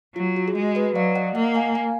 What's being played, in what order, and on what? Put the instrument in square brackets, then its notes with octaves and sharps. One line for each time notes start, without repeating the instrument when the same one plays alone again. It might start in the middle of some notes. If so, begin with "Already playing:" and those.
[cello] F#3 [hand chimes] F4
[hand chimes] F#4
G#4
[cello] G#3 [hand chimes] F#4
[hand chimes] B4 D#5
[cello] F#3 [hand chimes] D5 F5
[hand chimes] D#5 F#5
[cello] A#3 [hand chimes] D#5 F#5
[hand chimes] F5 G#5
F5 G#5